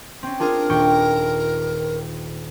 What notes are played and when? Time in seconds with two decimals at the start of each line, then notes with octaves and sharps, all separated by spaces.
0.23 C4 C#4
0.40 D4 F4 G#4 A#4
0.70 D#1 G5 C#6